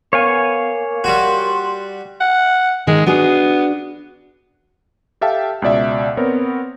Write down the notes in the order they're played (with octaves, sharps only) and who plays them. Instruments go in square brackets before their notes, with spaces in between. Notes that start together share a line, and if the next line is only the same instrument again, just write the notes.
[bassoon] A#3 [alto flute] B3 [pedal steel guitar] C#5 F5 G#5
[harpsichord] G3 F#4 [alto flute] C6
[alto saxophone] F#5
[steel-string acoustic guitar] D#3 [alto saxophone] G#3
[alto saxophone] B3 [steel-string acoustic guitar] D4 F#4 G#4
[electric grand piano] G4 A4 E5 F5 G5 A5
C#2 B2 D5 E5
B3 C4 A#4 C#5